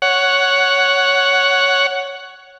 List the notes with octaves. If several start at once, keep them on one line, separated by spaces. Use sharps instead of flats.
C#5 F#5